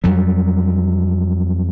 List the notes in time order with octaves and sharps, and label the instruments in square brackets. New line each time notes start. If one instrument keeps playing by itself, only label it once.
[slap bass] F2 F#3 G3